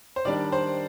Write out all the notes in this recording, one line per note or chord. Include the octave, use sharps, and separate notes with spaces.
C5
D#3 G3 D4 D5
C5